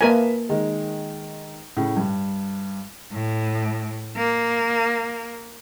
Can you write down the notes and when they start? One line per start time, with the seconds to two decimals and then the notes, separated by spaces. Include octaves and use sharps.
0.01 A#3 A#4 B4 E5 G#5 A5
0.49 D#3 G#3
1.77 A2 C#3
1.97 G2
3.12 A2
4.16 A#3